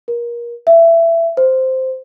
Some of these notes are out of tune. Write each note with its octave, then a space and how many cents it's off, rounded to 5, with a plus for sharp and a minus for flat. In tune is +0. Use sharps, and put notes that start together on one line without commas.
A#4 +25
E5 +20
C5 -5